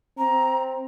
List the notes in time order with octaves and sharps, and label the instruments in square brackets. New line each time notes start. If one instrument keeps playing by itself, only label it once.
[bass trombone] C4 [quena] A#5